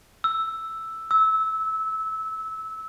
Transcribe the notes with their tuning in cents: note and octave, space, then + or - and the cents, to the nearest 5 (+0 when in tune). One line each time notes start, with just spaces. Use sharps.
E6 +0
E6 -20